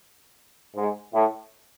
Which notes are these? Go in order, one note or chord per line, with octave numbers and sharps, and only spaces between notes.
G#2
A2